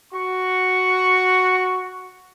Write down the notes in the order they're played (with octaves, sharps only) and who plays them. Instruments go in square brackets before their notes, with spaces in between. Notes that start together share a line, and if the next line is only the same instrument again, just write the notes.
[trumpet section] F#4 C#6